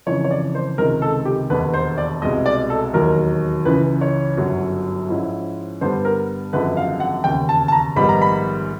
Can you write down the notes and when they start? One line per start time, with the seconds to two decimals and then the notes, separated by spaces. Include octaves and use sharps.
0.06 F2 C#3 E3 C#5
0.24 C#5
0.31 D5
0.55 C5
0.78 C#2 C3 D#3 G#3 A#4
1.02 A4
1.25 G4
1.50 E1 D#2 D3 B4
1.74 C5
1.98 D5
2.22 C2 B2 G#3 D#5
2.46 D5
2.70 A4
2.94 E1 D#2 D#3 F#3 A#4
3.65 C#2 C#3 E3 B4
4.01 C#5
4.37 G1 F#2 D3 F#3
5.09 G#2 F3 G#3 C#4 E4
5.81 G2 D3 G3 B3 C5
6.05 A#4
6.53 G#1 F#2 D3 F3 G#3 B4
6.77 F5
7.00 F#5
7.24 E1 D#2 C#3 G5
7.49 A5
7.68 A5
7.72 A#5
7.96 A#1 G#2 D#3 G3 B3 B5
8.09 A#5
8.22 B5